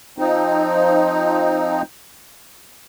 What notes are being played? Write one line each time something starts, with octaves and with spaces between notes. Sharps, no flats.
F3 C4 D#4